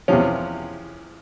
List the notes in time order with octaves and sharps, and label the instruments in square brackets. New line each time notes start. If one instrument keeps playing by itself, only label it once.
[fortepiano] E2 C3 F3 C#4